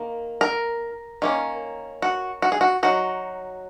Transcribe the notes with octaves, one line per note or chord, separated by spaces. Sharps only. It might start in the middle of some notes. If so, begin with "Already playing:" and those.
Already playing: D#3 A#3
A#4
D#3 A#3 C#4
F#4
F#4
G#4
F#4
F#3 D#4 F#4